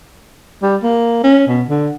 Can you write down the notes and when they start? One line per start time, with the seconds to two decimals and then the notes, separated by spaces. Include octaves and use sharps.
0.62 G3
0.83 A#3
1.23 C#4
1.47 B2
1.69 D3